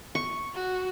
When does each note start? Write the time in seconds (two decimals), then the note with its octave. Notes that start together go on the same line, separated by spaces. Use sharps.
0.15 C#6
0.54 F#4